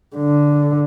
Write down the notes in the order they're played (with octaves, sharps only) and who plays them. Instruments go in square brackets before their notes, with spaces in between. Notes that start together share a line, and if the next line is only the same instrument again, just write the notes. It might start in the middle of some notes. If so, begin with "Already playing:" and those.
[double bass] D3